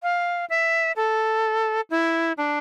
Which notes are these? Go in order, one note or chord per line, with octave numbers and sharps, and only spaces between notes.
F5
E5
A4
E4
D4